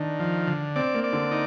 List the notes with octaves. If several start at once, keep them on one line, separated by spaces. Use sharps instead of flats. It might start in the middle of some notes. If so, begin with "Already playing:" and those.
Already playing: D#3 D4
F3
D3
C4 D5
A#3
D5
D3
D#4